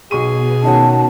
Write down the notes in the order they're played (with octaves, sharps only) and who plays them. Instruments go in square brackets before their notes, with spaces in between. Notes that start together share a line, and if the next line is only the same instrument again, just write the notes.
[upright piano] B1 C#6 D#7 [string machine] B2 [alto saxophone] G#4
[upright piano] D#3 C#4 F#4 [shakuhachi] A5